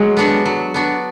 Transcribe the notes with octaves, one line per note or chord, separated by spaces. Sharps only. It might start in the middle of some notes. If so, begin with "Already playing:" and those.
Already playing: F#3 G#3
B3 D4 F#4
F#3
B3 D4 F#4